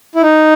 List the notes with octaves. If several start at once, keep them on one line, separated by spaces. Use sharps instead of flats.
E4
D#4